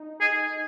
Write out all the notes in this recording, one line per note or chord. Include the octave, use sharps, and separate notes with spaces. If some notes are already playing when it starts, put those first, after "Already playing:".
Already playing: D#4
G#4